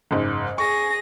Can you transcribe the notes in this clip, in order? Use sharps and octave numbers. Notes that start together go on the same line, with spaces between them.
F#1 G#2
G#4 C#6 A#6